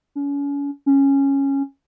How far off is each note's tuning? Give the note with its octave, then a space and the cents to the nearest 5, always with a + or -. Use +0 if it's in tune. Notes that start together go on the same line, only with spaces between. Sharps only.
C#4 +35
C#4 -10